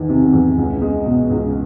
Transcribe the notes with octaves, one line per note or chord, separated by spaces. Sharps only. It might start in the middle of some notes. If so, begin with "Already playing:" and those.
Already playing: E2 D#3
C3
E2
C#2
G#3
B2
C#2